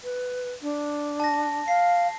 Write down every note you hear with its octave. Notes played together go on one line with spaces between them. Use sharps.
B4
D4
A5 A#6
F5 C7